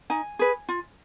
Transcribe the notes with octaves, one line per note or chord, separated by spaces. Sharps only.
D#4 G#5
G#4 B4
F4